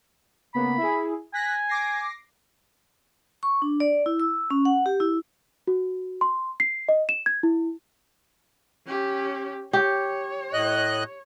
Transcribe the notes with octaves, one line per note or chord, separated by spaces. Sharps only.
C#3 A#3 B3 B5
E4 G#4
G#5 F#6 A#6 B6
D6 A#6 C7
C#6
D4
D5
E4
E6
C#4
F#5
G4
E4
F#4
C6
C7
D#5
E7
G#6
E4
C#4 G4
G4 C#5
A2 D#5 F#6